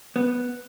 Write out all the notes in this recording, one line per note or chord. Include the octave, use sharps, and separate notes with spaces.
B3